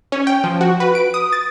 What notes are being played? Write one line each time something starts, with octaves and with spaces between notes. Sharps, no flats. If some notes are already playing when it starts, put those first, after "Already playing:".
C#4
G5
F3
F#4
B4
D7
D#6
A6